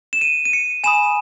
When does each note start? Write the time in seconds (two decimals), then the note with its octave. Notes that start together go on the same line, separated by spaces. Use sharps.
0.13 E7
0.21 D#7
0.45 D#7
0.53 C#7
0.84 G#5 B5 D#6 E7